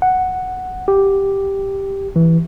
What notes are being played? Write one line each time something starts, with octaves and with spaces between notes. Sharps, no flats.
F#5
G4
E3